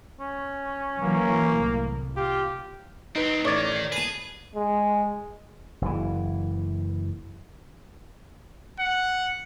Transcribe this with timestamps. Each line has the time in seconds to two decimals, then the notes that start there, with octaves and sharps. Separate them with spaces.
0.20 C#4
1.02 E3 F#3 A#3
1.51 C2 A2
2.17 F4 G4
3.16 F#3 C4 D#4 B4
3.45 A1 D#3 C#5 D5
3.72 G#6 C7
3.92 G#4 B4 A5
4.56 G#3
5.82 F#1 E3
8.80 F#5